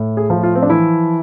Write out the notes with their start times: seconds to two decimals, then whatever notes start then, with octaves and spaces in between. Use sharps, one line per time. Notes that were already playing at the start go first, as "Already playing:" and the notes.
Already playing: A2
0.17 G#4
0.30 F3
0.43 F4
0.55 C4
0.63 D4
0.69 E3 E4